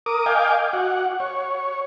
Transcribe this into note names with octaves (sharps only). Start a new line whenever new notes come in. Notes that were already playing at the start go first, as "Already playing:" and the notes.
A#4 D6 D#6
D#5 F5 G5 G#5 D6
F#4 F#5
C#5